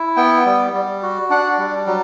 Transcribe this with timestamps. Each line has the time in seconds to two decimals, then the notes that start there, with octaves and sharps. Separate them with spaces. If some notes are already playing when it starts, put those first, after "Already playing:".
Already playing: E4
0.17 B3 G5
0.46 G3
0.73 G3
1.03 F#4
1.30 D4 F#5
1.58 G3
1.87 F#3